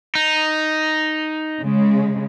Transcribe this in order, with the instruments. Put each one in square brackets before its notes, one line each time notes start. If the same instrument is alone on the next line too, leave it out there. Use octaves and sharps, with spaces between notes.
[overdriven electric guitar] D#4
[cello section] C#3 G#3